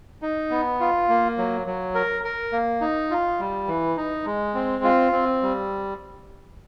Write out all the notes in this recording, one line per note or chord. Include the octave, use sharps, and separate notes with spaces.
D#4
B3
F4
A#3
F#3
F#3
A#4
A#4
A#3
D#4
F4
G3
E3
D#4
G#3
C4
F4
C4
G3